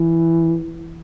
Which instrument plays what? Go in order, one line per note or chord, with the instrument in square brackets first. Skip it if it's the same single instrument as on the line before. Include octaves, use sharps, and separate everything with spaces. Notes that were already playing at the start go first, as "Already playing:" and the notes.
Already playing: [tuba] E3